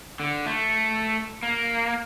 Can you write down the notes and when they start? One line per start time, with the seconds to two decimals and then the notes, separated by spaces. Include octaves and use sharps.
0.20 D3
0.46 A3
1.43 A#3